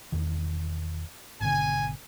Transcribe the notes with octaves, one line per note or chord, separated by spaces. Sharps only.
E1 E2 D#3
G#1 B2 D3 G#5